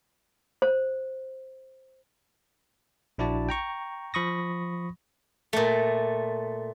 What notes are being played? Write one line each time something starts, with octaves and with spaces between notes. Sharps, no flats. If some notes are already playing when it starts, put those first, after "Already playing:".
C5
A#1 D4 E4 F#4 D5 A5
G5 A#5 C#6
F3 B5 C#6 D#6 A#6
A#2 A3